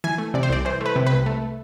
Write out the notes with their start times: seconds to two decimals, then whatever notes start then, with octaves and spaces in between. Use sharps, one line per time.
0.04 E3 G#5
0.18 A3
0.34 C3 D5
0.43 C5
0.49 C2 D5
0.65 E3 C5
0.81 A3 B4
0.96 C3
1.07 B4
1.12 C2
1.26 A3